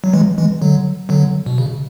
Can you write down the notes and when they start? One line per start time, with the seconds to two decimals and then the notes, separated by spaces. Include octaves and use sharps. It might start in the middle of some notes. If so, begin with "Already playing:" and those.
0.04 F#3
0.13 E3 G#3
0.38 E3 G#3
0.62 D3 F#3
1.09 D3 F#3
1.46 B2
1.58 C#3